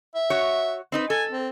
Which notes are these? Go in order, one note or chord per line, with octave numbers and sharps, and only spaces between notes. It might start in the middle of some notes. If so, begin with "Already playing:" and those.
E5
F#4 C#5
C4 D#4 B4
A4 G#5
C4